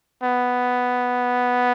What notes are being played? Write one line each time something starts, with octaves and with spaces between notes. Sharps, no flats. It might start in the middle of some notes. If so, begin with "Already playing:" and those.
B3